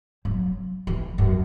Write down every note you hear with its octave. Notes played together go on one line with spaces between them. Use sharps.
F#3
E3
F#2